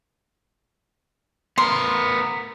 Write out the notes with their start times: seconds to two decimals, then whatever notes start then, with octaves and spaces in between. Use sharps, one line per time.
1.58 B3 A#4 C6